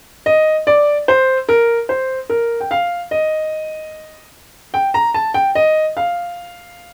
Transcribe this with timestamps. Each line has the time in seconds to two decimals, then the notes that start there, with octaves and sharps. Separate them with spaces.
0.26 D#5
0.67 D5
1.08 C5
1.49 A#4
1.89 C5
2.30 A#4
2.60 G5
2.71 F5
3.11 D#5
4.74 G5
4.94 A#5
5.14 A5
5.34 G5
5.55 D#5
5.97 F5